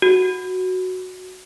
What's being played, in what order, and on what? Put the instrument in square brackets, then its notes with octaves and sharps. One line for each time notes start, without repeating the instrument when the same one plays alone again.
[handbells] F#4